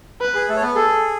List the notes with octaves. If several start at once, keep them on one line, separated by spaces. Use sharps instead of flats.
B4
G#4
A3 A4
C#5
B3 B4
G#4 A4